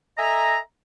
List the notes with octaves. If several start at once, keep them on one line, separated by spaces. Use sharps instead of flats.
A4 D#5 E5 G#5 A#5